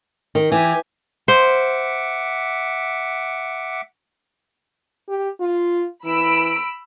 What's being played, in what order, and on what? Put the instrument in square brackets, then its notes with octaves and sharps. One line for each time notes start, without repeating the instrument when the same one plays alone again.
[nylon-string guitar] D#3
[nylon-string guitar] E3 [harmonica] G4 G#5
[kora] C5 [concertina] E5 F#5 D6
[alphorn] G4
F4
[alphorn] E3 [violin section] B5 E6 D7